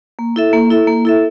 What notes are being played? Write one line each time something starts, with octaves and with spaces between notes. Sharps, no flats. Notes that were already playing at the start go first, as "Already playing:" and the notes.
A#3
E4 A4 E5
A#3
E4 A4 E5
A#3
E4 A4 E5